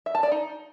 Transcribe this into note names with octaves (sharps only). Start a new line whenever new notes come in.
E5
A5
D5
D#4